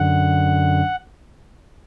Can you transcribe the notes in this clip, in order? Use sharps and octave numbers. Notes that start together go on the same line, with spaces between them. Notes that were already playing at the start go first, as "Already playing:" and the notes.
Already playing: F#2 D3 F#5